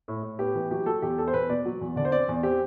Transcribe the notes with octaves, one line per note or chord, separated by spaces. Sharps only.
A2
A2
B3 G4
E3
F#3 G4
F#3 A4
E2 G4
E2 A4
C5
E2 B4
B2 D5
F#3
E2
D3 D5
C5
C4 D5
E2
C4 G4